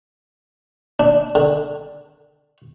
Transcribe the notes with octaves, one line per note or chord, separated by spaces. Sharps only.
D4
D3